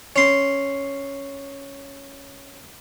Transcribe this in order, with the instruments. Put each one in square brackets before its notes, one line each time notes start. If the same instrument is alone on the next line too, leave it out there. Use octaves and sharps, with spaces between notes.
[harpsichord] C#4 C6